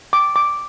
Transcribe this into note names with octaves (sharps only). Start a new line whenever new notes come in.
D6
D6